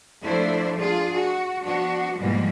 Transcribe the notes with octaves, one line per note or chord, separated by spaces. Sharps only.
F3 A3 D4 E4 C5 D5
D4 F4 G#4
F#4
F3 B3 D4 F#4
G#2 B2 E3 F3 G3 A#3